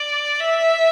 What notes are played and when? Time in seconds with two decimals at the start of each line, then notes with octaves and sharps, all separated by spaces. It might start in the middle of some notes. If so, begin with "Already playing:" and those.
Already playing: D5
0.40 E5